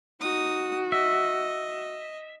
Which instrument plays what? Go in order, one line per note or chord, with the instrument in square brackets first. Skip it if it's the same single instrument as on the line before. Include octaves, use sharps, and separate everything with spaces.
[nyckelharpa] D#4 D#6 [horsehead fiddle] F#4
[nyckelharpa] D#5 [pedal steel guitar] E5